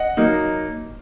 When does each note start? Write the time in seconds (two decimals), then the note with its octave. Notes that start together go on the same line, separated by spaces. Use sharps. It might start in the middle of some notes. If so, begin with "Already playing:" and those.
Already playing: D#5 F#5
0.17 F#3 A#3 D#4